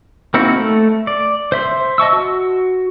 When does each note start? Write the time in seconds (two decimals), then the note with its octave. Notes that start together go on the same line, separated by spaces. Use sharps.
0.34 A#3 C4 D#4 E4 F#4
0.56 A3
1.07 D5
1.52 C5 E5 C6
1.98 D#5 A5 C#6 E6
2.13 F#4